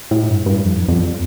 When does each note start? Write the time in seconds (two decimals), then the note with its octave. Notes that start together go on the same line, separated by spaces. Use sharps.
0.11 A2
0.29 G2
0.46 G2
0.65 F2
0.88 F2